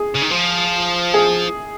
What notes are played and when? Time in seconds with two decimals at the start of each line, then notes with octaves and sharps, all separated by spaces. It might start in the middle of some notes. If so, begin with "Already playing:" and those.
Already playing: G#4
0.16 C#3
0.23 D#3
0.31 F3
1.14 G#4